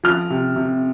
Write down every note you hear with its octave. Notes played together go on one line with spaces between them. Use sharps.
F3 F6
C3
C3